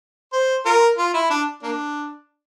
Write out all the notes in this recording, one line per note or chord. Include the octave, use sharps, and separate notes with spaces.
C5
F4 A#4
F4
E4
D4
A#3 D4